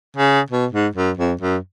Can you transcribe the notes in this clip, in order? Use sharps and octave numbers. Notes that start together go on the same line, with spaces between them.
C#3
B2
G#2
F#2
F2
F#2